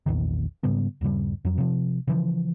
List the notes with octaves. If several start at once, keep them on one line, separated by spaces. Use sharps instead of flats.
A#1 E2 A#2 D#3
G#2 C#3 G3 B3
D#1 G2 C#3 G3
F2 F#3
C3 F3
C#3 E3 F3